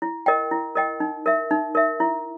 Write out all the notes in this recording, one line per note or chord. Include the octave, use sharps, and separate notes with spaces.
E4
A#4 D#5 G5
E4
A#4 D#5 G5
D#4
A#4 E5
D#4
A#4 E5
E4